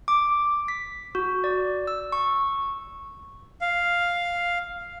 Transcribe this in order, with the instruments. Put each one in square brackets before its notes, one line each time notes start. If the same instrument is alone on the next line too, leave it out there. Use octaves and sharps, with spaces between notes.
[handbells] D6
B6
F#4
D5
E6
C#6
[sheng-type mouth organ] F5